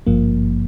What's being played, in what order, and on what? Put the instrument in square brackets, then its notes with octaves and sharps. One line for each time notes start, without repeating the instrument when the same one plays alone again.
[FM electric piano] G#1 G2 F3 A#3